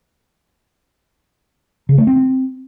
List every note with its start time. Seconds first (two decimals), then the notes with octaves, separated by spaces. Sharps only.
1.89 C#3
1.98 A3
2.07 C4